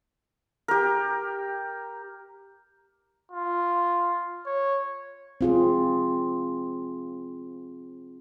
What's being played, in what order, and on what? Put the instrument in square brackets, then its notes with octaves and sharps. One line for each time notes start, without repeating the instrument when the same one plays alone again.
[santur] G4 A#4
[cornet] F4
C#5
[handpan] C4 F4 G#4